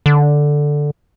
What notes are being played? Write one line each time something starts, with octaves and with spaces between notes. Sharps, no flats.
D3